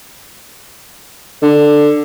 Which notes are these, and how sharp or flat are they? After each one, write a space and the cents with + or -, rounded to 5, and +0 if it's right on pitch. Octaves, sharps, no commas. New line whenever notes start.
D3 +10